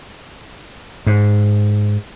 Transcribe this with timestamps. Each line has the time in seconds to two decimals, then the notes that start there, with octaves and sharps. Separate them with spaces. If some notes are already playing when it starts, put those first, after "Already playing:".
1.07 G#2